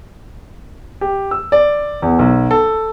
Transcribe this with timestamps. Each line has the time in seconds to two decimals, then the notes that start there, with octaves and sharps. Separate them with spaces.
1.01 G4
1.31 E6
1.52 D5
2.02 E2
2.19 B1
2.51 A4